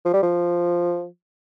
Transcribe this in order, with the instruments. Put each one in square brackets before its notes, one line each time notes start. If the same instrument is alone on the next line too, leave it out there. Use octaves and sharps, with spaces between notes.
[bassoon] F3
G3
F3